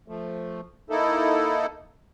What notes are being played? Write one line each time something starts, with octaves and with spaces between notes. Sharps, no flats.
F3 A3
A#3 D#4 E4 A4